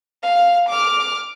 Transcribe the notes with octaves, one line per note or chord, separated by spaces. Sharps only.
F5
D6 F6